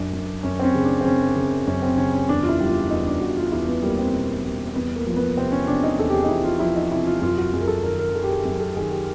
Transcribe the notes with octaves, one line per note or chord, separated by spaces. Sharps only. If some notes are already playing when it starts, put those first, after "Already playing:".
Already playing: F#2 D4
F#2
F#2 C#4
C4
C#4
C#3
D4
C4
C#3 C#4
C#3
F#2 C#4
C4
C#3 C#4
C#4
E2 D4
F4
E4
G3
F4
E2 D#4
D4
E2 F#4
F4
E2 E4
B3
G3 A#3
C4
B2
G3
E2 B3
A#3
F3
B3
C3 C4
C#4
C3 D4
D#4
E2 A4
G4
G#4
D#4
E2 E4
F4
F3 E4
D#4
C3 E4
F4
F#2 F4
F#4
F#2 G#4
A#4
A4
D#3 A#4
A#4
D#3 A4
G4
G#4
F#2
A4
D#3 G#4
G4